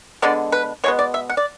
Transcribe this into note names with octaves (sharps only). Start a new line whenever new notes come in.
D3 G#3 B3 D5
B4
B2 G#3 B3 C#5
D5
E5
F#5
D5